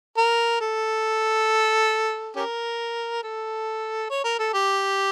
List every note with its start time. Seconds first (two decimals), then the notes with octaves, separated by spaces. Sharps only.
0.18 A#4
0.61 A4
2.35 C#4 G4 A#4
3.23 A4
4.10 C#5
4.24 A#4
4.39 A4
4.54 G4